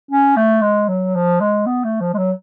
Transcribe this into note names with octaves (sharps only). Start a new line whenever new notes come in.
C#4
A3
G#3
F#3
F3
G#3
B3
A3
F3
G#3
F#3